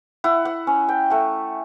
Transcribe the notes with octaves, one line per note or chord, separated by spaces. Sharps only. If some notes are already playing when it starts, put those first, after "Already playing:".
E4 F#5
F#5
C#4
G5
A3 F#5